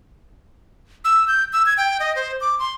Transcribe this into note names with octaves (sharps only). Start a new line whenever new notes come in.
E6
G6
E6
G#6
G5
D#5
C5
D6
C6